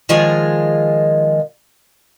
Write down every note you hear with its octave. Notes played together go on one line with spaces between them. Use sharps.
D#3 F3 G#3 F4 G#4 A#4